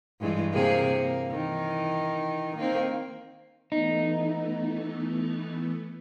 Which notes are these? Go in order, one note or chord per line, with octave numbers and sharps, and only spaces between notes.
G2 E3 G#3
C3 A#3 G#4
A#3
D#3 E3
D#3 A#3 C4
E3 A3 B3 D#4